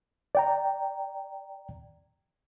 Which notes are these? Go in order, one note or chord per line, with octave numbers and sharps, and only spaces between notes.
D5 G5 A#5